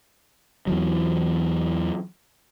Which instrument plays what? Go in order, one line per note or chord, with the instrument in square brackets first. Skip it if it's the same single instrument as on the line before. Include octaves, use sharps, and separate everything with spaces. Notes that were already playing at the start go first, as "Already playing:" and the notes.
[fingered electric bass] E2 E3 F#3